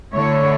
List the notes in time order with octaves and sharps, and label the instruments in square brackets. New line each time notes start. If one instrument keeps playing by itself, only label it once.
[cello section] D3 A3 E4 C#5